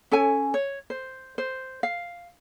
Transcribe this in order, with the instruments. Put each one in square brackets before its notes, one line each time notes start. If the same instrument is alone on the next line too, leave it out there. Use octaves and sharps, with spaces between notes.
[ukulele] C#4 A4 C#5 G#5
C#5
C5
C5
F5